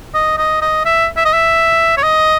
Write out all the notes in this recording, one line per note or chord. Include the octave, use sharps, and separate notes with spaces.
D#5
D#5
D#5
E5
E5
D#5
E5
C#5
D#5